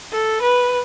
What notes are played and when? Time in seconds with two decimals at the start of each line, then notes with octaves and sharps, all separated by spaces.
0.12 A4
0.42 B4